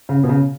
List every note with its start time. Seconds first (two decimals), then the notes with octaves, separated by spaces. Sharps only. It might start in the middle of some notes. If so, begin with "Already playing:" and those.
0.09 C#3
0.24 B2
0.29 C#3